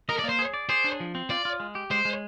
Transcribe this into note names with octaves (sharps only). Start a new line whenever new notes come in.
A#4 D#5
D5
A#3
C5
G#4
D5
G#4 C5
D4
F3
C4
F4 D5
F4
G#3
G4
G#3 C5
G#3